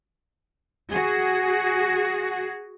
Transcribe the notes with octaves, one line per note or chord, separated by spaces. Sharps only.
F#4 G#4